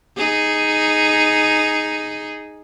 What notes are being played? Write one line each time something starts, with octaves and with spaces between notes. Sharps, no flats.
D#4 G#4